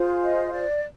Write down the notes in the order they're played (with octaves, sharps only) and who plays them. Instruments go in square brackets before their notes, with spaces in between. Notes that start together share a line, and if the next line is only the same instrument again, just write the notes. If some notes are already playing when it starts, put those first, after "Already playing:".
Already playing: [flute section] F4 G#4 C5
D#5
D5